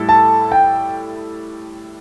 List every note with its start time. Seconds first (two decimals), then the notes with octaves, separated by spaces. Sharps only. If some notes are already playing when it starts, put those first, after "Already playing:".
Already playing: A2 G3 E4 A4
0.09 A5
0.52 G5